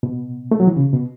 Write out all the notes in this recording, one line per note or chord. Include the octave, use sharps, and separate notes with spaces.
B2
A3
F#3
E3
C#3
B2